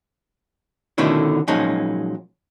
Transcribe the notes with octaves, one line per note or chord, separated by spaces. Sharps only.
B2 D3 D#3 A3 C#4 E4
A#2 F3 F#3 G#3 C#4 D#4